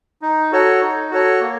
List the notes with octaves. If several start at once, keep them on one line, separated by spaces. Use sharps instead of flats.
D#4
F#4 A4 C#5
D#4
F#4 A4 C#5
A#3